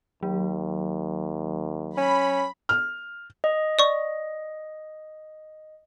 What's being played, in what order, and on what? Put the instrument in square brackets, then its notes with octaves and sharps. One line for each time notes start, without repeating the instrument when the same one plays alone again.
[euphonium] D#2 [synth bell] F#3
[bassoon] C#4 [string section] B5
[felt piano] F6
[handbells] D#5
[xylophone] D5 C#6